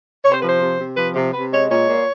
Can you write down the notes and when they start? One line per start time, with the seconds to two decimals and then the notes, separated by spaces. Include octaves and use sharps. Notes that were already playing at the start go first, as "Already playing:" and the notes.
0.24 C3 C#5
0.32 C5
0.41 F3 B4
0.49 C5
0.61 C3
0.79 C3
0.97 F3 B4
1.15 C3
1.33 C3 B4
1.52 G#3 C#5
1.70 A#2 C#5
1.89 A#2